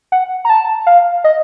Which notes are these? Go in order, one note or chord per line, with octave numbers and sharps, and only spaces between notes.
F#5
A#5
A5
F5
D#5